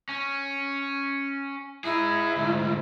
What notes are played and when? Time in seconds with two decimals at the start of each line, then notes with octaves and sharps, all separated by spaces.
0.09 C#4
1.84 D#4 E4 G#4
2.36 D2 G#2